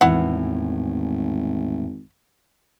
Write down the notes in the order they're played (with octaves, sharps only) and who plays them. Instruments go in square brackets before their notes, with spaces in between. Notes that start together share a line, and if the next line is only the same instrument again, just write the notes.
[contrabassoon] G#1 [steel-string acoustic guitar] E2 A2 [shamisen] E4 F#5